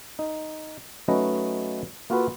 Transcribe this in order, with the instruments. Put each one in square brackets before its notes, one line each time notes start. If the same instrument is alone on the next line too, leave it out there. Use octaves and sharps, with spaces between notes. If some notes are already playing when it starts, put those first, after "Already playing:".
[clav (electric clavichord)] D#4
F#3 A3 C#4 D#4 B4 D#5
A#3 F4 F#4 A4 B4